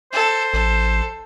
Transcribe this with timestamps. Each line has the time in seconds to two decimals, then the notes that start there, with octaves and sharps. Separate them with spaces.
0.12 A4 C5
0.54 A1 A4